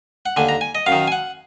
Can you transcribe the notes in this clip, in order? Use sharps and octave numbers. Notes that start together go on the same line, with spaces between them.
F#5
D#2 D3 G#5
A#5
G#5
D#5
F#2 F5
D#3
G#5
F#5